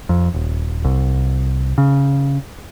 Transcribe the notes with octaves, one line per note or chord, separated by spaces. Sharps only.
F2
D#1
C2
C#3